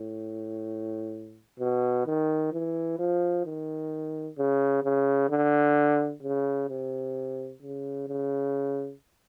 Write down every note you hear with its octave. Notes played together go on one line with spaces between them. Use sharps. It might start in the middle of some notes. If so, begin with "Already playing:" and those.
Already playing: A2
B2
D#3
E3
F3
D#3
C#3
C#3
D3
C#3
C3
C#3
C#3